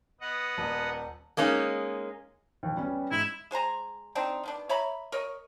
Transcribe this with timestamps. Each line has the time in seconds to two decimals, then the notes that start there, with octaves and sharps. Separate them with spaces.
0.21 B3 D#5 F#5
0.58 D#1
1.37 G#3 A#3 C#4 D#4
2.63 A#1 D#2
2.76 G3 B3 C#4
3.11 G#2 E4
3.51 G#3 C5 G#5 A#5
4.15 C4 D4 D#4
4.44 D#3 B3 D4
4.69 C#5 E5 A#5 B5
5.12 A#4 C#5 D#5